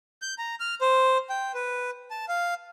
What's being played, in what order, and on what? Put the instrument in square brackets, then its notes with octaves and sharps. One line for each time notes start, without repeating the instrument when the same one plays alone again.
[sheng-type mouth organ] G6
A#5
F6
C5
G5
B4
A5
F5